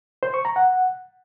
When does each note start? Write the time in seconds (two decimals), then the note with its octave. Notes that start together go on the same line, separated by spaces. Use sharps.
0.23 C5
0.34 C#6
0.45 A#5
0.56 F#5